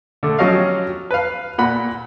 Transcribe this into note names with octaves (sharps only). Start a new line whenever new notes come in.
D3 A3
F3 F#3 C#4 G4 D#5 F5
B4 F5
A#2 F#5 B5